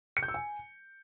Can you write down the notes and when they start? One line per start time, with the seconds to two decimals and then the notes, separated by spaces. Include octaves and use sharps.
0.17 C#7
0.23 G6
0.28 E6
0.34 G#5